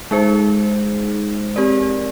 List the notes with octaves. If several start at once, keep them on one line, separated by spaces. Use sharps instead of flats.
G#3 D#4 G#4 C5
C4 G4 A#4 D5